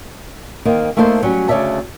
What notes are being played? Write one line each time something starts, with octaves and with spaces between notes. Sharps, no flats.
D#3 A#3 C4
A3 A#3 D#4 E4 A4 C5
F#3 G3 C#4
D2 C#3 C#5 D5 E5 A5